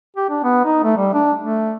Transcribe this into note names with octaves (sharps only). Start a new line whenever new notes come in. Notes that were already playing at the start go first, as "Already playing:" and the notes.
G4
D4
B3
D#4
A3
G3
D4
A3